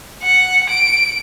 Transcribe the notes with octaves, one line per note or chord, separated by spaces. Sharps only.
F#5
D7